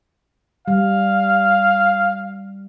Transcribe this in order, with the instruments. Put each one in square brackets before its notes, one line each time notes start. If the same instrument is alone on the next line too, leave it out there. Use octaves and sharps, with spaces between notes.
[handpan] G3 [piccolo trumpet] F5